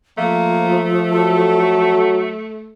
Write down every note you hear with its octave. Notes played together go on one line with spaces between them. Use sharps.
F3 A3 A#3
F#3 A4